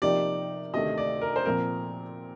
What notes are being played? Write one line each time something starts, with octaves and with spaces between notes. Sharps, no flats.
C3 F3 A#3 D#4 G4 D5
D2 C3 D#3 A3 D#5
D5
A#4
C5
A#2 F3 C4 A#4